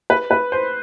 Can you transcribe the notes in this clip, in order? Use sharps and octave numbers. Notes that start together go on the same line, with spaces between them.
B4
B4
C5